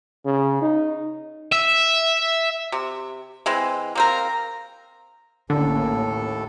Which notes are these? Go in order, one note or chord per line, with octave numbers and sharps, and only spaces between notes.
C#3
D#4
E5
C3
E3 G#3 C4
A#3 C4 A#4
A1 D#2 A2 D3 A#3 C#4 A4